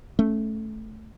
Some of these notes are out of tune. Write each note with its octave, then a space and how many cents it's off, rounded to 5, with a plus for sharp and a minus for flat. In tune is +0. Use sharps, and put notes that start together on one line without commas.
A3 -10 C#4 +0